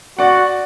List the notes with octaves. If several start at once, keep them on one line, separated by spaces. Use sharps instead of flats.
F#4 D5 F#5